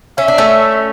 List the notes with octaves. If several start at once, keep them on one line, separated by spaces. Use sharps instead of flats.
C#4 E5
D4
A3 C#4